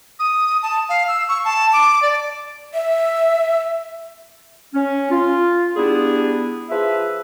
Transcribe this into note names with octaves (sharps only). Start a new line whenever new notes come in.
D#6
A5
F5
E6
C#6
A5
D6
D5
E5
C#4
F4
G3 B3 D4 E4 G#4
F3 G#4 B4 E5